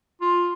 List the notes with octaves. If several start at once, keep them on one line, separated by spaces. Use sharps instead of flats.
F4